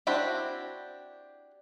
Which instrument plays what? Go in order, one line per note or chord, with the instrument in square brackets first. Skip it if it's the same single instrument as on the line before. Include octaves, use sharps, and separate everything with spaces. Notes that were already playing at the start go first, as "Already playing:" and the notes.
[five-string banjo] C4 D4 E4 F#4 G4